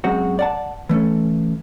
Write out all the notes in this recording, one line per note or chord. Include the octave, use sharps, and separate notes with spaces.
F#2 G#3 C4 F#4
D5 F#5 A5
E3 A3 C#4 A4